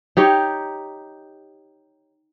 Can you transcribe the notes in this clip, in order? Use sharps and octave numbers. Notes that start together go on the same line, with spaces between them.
D#4 G4 C#5